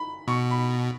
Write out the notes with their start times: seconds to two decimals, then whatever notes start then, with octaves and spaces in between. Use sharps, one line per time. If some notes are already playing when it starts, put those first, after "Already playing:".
Already playing: B5
0.28 B2 C#6
0.50 B5